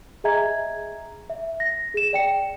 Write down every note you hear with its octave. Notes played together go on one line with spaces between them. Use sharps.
G#4 D#5 E5 G#5 A#5 G#6
E5
A#6
G#4 E7
D5 G5 C#7